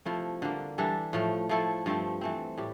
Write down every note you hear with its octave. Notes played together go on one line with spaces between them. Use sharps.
C3 F3 A3 E4
D3 G3 A#3
E3 G3 D4 A4
A2 F3 A3
F3 A3 E4 A4
G2 F3 A3 C4
E3 A3 C4
A2 G3 G4